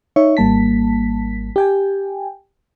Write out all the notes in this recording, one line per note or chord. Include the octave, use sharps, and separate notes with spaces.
D#4 C#5 E5 C#6
G#1 G3 A#3 A5 B6
G4 G5 G#5